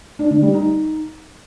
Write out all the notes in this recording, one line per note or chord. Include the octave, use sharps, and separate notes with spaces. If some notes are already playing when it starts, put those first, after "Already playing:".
D4
D3
G3
D#4